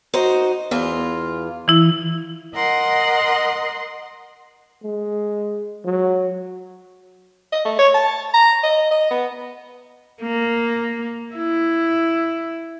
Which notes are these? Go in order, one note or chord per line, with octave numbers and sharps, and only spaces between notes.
D#4 F#4 C5
E2 F4
E3 E4
A#4 D#5 F#5 C6
G#3
F#3
D#5
A3
C#5
A5
A#5
D#5
D#5
B3
A#3
E4